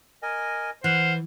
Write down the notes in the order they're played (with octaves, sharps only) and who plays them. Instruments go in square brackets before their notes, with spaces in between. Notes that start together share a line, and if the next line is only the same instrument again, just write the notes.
[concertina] A#4 D#5 G#5
[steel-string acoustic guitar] E3 [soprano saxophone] C5 [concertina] F#5 F6 F#6